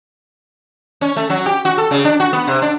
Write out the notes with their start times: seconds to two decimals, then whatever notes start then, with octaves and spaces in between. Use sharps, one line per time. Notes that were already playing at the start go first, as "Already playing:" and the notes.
1.01 C#4
1.16 A3
1.30 F#3
1.46 G4
1.65 F#4
1.78 A4
1.91 C#3
2.05 D4
2.20 F#4
2.33 B3
2.47 C3
2.62 D4